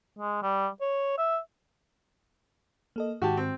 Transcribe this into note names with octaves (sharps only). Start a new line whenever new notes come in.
G#3
G3
C#5
E5
A#3 A4 D#5
G#2 D#3 F#4 G4 A5
C4